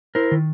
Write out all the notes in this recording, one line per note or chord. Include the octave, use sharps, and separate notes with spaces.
E4 A#4 C5
D#3